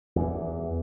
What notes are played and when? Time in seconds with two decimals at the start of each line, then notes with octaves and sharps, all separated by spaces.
0.16 E2 E3